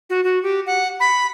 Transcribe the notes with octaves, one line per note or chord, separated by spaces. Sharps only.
F#4
F#4
G4
F#5
B5